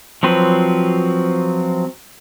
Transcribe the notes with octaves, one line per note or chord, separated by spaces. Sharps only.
F3 F#3 C4 B4